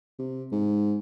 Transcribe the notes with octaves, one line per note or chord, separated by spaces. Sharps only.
C3
G#2